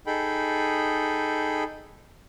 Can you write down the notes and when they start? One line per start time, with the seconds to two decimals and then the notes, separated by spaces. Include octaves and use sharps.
0.07 D#4 G#4 A4 G5 B5